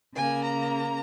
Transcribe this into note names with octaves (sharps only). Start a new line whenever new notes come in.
C#3 A#3 G#5
A#5